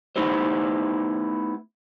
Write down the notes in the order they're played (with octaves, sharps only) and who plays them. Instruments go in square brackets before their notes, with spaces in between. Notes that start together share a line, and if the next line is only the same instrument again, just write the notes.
[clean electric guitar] A3 B3 D#4 E4 G4 C5